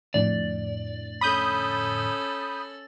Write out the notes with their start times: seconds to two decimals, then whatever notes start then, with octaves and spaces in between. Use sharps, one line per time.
0.14 F2 A2 D3 D5
1.21 C#4 A4 B5 D#6 G6